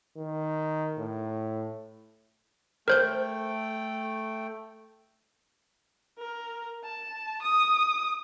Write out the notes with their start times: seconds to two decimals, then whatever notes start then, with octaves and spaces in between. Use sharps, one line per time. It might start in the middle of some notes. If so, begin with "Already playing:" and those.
0.17 D#3
0.98 A2
2.88 A3 A#4 C5 G5 G6
6.18 A#4
6.84 A5
7.42 D#6